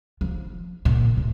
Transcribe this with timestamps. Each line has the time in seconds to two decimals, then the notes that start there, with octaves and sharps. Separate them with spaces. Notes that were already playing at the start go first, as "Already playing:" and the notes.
0.21 F3
0.85 A#2
1.17 A2